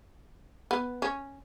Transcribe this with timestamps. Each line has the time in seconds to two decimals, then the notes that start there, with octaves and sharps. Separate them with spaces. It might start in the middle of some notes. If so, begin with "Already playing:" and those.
0.71 B3
1.02 C#4